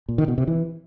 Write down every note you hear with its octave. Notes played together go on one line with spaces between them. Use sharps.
A#2
D#3
B2
C3
E3